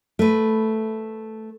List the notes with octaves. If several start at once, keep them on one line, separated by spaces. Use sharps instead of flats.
A3 B4